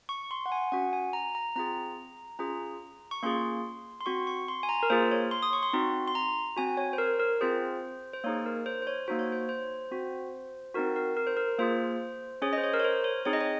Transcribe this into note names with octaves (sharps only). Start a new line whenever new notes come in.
C#6
C6
F#5
G#5
C#4 F#4 F#5
G#5
A#5
A#5
C4 F4 G#4 A#5
C#4 F4 G#4 A#5
C#6
A#3 C#4 F4 G#4 C6
C6
C4 F#4 C#6
C#6
C6
G#5
A#5
A#4
A#3 F4 G#4 C5
C#5
C6
D#6
C#6
C6
C4 D#4 F#4
C6
A#5
C4 F#4 G#5
C#5
C5
A#4
A#4
C4 F4 G#4 C5
C5
A#3 D#4 G#4 C#5
A#4
C5
C5
C#5
A#3 D#4 F#4 C5
C#5
C5
C5
C4 F#4
C4 D#4 F#4 A#4
A#4
A#4
C5
A#4
A#3 F4 G#4 C5
C#4 G#4 C#5
C5 D#5
C#5
A#4
C#5
C5
C#5
C4 D#4 G#4 C#5
D#5
C#5